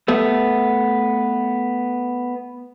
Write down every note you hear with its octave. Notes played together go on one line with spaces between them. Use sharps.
A3 B3